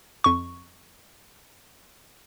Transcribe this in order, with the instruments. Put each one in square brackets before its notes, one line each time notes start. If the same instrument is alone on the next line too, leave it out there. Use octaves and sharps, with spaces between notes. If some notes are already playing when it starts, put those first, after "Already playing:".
[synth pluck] F2 C#6